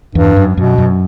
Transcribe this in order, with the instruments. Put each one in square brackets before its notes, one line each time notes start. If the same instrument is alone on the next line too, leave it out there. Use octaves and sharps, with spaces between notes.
[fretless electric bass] E2 [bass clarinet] G2
[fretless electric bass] F#2
[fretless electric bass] F#2 [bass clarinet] B2
[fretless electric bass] F#2